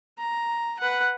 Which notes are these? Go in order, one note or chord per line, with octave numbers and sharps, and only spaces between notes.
A#5
B4 F#5